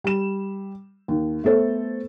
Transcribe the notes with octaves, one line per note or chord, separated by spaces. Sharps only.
G3 E7
D#2
A3 B3 A4 C5